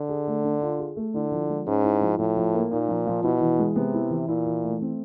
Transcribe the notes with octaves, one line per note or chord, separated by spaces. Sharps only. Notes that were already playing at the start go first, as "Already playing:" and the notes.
Already playing: D3
G#4
A3
D4
F4
G#4
A3
D3 E4
F3
G#3
G#2 C#4
E4
F3
A2 F3
F3
A#3
A#2 D#4
F3
F3
B2 E4
E3
G#3
C3 B3
E4
E3
A#2 E4
E3
A3
C4